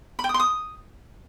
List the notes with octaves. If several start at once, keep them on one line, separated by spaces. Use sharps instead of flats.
B5
G5
D#6
C6
D#6